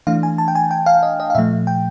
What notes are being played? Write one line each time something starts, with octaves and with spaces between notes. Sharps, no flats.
E3 A3 D4 F5
G#5
A5
G5
G#5
G5
F5
D#5
D#5
F5
A#2 F3 A3 E5
G5